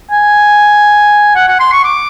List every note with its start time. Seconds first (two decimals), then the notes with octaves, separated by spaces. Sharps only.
0.11 G#5
1.35 F#5
1.48 F#5
1.60 C6
1.72 C#6
1.84 D6